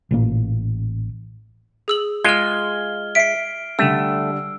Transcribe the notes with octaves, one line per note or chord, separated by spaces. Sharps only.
A1 A#2 A#3
G#4 E6 F#7
G#3 F4 F6 G#6 G7
E5 B6 C7 D7
D3 G3 A3 E6